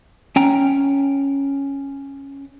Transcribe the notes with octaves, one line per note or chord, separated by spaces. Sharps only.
C#4 G5 A#5